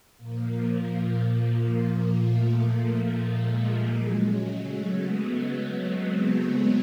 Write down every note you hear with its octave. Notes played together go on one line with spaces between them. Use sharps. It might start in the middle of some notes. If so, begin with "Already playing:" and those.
A#2 F3 A#3
A3
A#3
A3
G#3
G3
C#3 F#3 G#3
A3
B3
C4
C#4